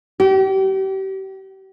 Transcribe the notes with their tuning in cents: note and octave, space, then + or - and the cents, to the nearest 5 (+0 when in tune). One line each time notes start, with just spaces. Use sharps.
G4 -35